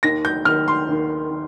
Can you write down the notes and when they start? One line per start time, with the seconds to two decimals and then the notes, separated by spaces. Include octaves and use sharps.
0.03 D#2 D#3 A#6
0.25 G6
0.45 D#2 D#3 F6
0.68 C6
0.88 D#2 D#3
1.31 D#3